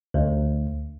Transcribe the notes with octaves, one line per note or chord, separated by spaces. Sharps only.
D2